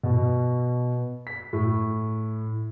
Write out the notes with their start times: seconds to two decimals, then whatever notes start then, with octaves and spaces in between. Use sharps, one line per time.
0.03 B2
1.27 B6
1.53 A2